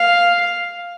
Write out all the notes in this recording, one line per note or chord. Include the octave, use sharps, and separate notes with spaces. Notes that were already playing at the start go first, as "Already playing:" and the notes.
Already playing: F5